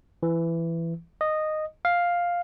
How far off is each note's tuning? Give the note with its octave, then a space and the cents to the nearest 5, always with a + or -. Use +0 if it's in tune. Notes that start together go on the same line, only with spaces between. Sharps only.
E3 +15
D#5 -10
F5 +5